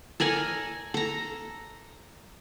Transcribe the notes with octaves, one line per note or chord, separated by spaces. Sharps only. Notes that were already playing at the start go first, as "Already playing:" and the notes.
A4 A#4 D5 G#5
A4 A#5